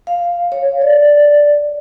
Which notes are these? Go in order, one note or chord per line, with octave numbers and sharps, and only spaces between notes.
F5
C#5
D5